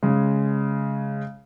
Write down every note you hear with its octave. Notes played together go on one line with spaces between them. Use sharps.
C#3 G#3